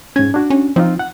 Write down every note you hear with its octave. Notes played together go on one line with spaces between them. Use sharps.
G#2 C#4 G#6
D4 F#4
C#4
F3 C4 D#4 F4
F#5